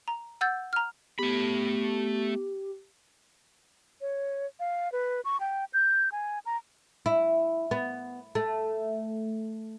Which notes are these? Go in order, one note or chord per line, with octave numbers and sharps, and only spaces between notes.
A#5
F#5 E6 G6 A6
A#5 F6
A3 B3 G4 B5
C#5
F5
B4
C#6
G5
G6
G#5
A#5
E4
B3
A3